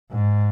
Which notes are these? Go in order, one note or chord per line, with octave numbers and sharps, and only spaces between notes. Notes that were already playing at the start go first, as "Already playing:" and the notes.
G#2